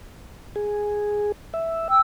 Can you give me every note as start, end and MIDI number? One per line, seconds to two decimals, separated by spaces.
0.56 1.32 68
1.54 1.88 76
1.89 2.00 79
1.89 2.00 88